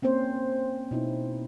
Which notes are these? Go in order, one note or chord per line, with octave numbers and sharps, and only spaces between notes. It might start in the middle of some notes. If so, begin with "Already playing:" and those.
A#3 C4 C#4 C5
B2 D#4 E4